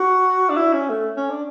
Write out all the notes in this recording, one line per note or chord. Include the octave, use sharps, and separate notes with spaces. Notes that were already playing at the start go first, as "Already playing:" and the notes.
Already playing: F#4
D4
E4
C#4
A3
C#4
D4